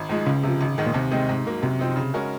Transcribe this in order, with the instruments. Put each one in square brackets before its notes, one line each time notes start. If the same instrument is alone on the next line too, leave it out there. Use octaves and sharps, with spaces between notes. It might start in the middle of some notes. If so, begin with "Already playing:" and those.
Already playing: [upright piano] G#1
G#2 F3 G#3
[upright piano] C#2 [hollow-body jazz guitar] C#3
[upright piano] C3 F3
G#1
G#2 D#3 G#3
[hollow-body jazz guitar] A#2
[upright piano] D#2 [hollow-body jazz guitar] C3
[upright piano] D#3 G#3 C4 D#4
G#2
F#3 A#3
[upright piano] F#2 [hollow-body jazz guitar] C3
[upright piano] F3 C4 D#4
C#3
G#3 C#4 F#4 A#4